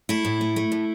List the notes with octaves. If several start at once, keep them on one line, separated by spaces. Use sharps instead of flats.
A3 E4
A2
A3
A3
A2